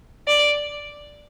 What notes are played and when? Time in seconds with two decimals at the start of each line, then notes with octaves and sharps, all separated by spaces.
0.28 D5